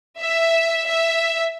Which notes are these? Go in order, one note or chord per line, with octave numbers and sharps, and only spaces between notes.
E5
E5